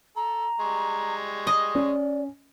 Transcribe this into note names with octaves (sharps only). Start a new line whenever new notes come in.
A4 A#5
G3 G#3 C#6
D#5
C#4 D5